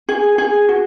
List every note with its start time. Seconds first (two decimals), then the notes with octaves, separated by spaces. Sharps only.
0.09 G#4
0.38 G#4
0.69 F#4